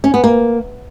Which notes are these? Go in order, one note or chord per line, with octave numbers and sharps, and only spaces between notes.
C#4
B3
A#3